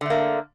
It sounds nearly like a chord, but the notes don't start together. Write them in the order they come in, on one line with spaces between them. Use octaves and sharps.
D3 A3 A#3